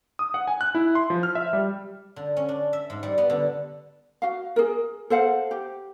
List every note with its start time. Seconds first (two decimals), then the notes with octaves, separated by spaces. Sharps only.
0.19 D#6
0.34 F#5
0.47 G#5
0.61 F#6
0.75 E4
0.95 C6
1.10 F3
1.23 F6
1.35 E5
1.53 G3
2.16 D3
2.36 C#4
2.49 D4
2.73 E5
2.90 G#2
3.03 G3
3.18 B3
3.30 D3
4.22 F#4 F5
4.56 G#4 A#4
5.10 A4 C5 F5 F#5
5.51 G4